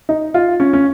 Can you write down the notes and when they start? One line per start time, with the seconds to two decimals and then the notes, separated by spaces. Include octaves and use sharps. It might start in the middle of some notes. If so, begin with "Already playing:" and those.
0.09 D#4
0.34 F4
0.60 C#4
0.73 C#4